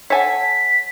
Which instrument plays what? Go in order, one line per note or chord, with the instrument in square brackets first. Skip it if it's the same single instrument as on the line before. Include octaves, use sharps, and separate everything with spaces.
[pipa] A4 G#5 [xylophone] C#5 F#5 [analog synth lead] B6